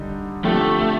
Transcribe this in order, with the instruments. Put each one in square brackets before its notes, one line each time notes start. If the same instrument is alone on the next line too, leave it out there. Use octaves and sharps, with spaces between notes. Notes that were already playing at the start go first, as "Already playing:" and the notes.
Already playing: [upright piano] D3 G3 D#4
[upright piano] D3 F3 C4 G4 [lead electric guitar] A3